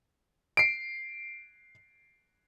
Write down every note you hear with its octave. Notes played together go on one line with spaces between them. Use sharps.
C7 D7